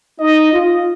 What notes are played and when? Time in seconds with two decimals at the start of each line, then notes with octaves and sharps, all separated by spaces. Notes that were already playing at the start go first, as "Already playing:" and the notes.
0.19 D#4 D#5
0.53 F4